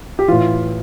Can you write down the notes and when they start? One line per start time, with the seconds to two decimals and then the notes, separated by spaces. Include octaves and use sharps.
0.19 G4
0.28 A2 E3 F4